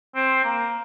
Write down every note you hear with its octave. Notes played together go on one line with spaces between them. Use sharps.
C4
A#3